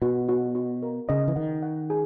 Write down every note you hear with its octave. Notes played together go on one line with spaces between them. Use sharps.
B2 F#4
F#4
F#4
A#4
C#3 D#5
E3
D#3 F#5
F#5
G#4